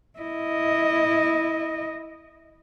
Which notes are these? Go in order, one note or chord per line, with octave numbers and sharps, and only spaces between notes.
E4 D#5